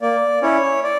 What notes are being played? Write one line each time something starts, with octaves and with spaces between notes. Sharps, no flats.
A#3 D5
C#4 E4 C#5
D5